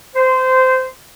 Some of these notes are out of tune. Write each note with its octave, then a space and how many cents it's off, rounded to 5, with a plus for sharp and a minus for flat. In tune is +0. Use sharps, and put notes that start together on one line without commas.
C5 -20